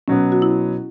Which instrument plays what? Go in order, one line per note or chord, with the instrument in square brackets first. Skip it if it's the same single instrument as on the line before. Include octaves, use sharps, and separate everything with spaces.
[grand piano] B2 F#3 B3 [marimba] C#4
[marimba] F#4
E4